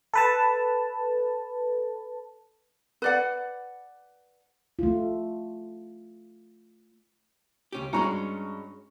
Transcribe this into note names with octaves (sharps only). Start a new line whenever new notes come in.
A4 B4 A5
B4 D5 F#5
A3 F4
C#2 C#4 G4
G2 G#3 C#4 F#4 A#5 C#6